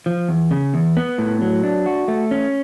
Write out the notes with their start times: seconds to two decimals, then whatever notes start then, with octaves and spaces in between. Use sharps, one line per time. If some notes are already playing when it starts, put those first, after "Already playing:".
0.06 F3
0.29 E2
0.51 C#3
0.74 E2
0.97 B3
1.18 A2
1.41 F#3
1.64 D4
1.86 F#4
2.08 A3
2.31 C#4